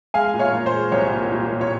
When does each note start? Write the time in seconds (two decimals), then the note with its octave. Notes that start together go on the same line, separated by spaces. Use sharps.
0.14 G#3 F5 G#5
0.34 A#2
0.39 C#5 F5
0.53 A#2
0.66 C5
0.73 G#3
0.92 C2 C#5
1.12 A#2
1.32 A#2
1.51 A#2
1.61 C#5